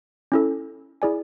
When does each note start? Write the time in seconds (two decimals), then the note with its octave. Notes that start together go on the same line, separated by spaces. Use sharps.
0.32 C#4 E4 A4
1.02 E4 G#4 D5 G#5